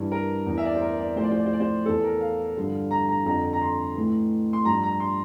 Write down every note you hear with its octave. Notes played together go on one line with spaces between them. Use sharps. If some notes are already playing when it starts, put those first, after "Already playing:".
Already playing: G2 E3
A#4
E2 E3
E5
D5
C5
A#4
D5
A2 F3 C5
D5
C5
D5
C5
D5
C5
E2 E3 A4
A#4
F5
G2 D3 F3
A#5
A#5
F2 D3 F3 A#5
A#5
C6
A2 E3
C6
G2 F3 A#5
A#5
C6